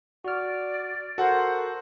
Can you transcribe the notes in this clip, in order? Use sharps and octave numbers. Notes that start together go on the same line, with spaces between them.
F#4 D5 F6
F#4 A4 A#4 C5 F#5